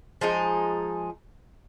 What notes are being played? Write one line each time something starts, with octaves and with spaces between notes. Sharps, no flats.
F3 G#3 D#4